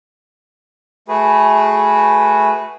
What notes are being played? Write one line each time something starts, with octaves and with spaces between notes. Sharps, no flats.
A3 F#4 G#4 B4